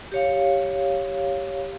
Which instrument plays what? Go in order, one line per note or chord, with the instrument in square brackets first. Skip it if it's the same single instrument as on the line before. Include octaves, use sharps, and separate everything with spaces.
[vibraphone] G4 C#5 F5